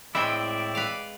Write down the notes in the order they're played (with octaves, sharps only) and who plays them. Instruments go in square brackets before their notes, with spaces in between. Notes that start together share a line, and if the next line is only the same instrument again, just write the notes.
[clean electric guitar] A2 C4 E4 [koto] G#3 G5 G#5 [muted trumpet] D5
[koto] B4 F5